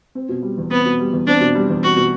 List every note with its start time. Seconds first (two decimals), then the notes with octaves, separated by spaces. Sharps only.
0.15 C4
0.29 B2
0.42 G3
0.57 E2
0.71 B3 C4
0.85 B2
0.99 G3
1.12 E2
1.27 C4 D4
1.41 B2
1.55 G3
1.69 E2
1.83 C4 F#4
1.96 B2